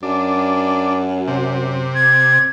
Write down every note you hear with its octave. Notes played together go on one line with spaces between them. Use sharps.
F#2 D4
C3
G#6